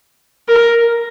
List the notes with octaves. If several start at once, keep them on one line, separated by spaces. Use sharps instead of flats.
A#4